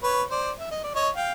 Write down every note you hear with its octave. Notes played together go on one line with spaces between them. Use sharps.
B4 C#5
C5 D5
E5
D#5
D5
C#5 D#5
F5 G5